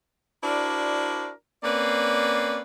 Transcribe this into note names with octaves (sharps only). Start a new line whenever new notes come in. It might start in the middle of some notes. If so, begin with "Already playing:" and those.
D4 E4 F#4 A#4 C5 D5
A#3 C4 C#4 B4 D5